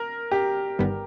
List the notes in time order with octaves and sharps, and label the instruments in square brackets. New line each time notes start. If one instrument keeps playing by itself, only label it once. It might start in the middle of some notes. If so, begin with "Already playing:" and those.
Already playing: [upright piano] A#4
G4
[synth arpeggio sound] G1 G2 D#3 G3 B3